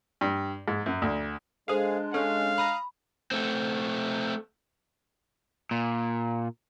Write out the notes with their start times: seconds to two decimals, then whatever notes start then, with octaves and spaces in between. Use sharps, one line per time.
0.21 G2
0.68 G#2
0.86 F#2
1.02 D2
1.68 G#3 D4 G#4 A4 C5 F5
2.14 C#4 A4 C#5 F5
2.58 A#5 B5 D#6 F#6
3.32 A3 C4
5.71 A#2